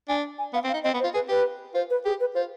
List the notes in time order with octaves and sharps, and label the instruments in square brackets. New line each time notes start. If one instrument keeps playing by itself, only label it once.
[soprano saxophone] D4 [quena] G#5
[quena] G#5
[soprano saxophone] B3 [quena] F5
[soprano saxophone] C4
[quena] F5
[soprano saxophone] D#4
[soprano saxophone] C4 [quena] D#5
[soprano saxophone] B3
[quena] C5
[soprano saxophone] F4
[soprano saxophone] G#4 [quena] B4
[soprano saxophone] G4 [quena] B4
[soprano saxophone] F4 [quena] C5
[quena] B4
[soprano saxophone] G4 [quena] G#4
[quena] B4
[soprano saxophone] F4 [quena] C5